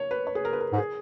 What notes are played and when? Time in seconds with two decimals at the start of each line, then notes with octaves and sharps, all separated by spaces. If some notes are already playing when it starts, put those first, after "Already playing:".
Already playing: C#5
0.11 B4
0.27 C#5
0.35 G#4
0.45 A#4
0.53 B4
0.60 A#4
0.73 G#2
0.78 G#4